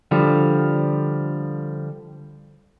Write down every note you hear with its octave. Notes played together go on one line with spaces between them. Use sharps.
D3 F3 G3